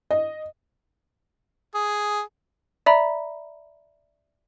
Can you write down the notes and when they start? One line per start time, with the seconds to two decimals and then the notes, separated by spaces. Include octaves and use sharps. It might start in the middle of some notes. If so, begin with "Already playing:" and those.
0.11 D#5
1.74 G#4
2.86 D5 E5 A#5 B5